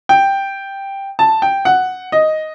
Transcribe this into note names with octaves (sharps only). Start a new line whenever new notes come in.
G5
A5
G5
F#5
D#5